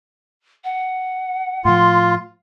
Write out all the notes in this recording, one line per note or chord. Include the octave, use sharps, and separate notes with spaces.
F#5
A2 F3 F4 C6